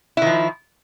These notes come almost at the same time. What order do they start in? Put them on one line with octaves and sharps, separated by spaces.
E4 D#3 F3